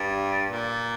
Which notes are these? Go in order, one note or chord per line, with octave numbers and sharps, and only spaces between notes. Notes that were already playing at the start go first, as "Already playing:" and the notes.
Already playing: G2
A#2